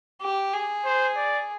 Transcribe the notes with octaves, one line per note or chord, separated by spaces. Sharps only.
G4
G#4
C5
D5